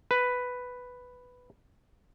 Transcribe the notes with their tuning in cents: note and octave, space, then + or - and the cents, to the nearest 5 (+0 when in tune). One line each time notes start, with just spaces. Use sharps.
B4 +5